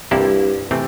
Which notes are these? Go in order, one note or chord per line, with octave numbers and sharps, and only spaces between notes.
C2 G2 C3 F3 A#3 E4
C3 E3 A3 C4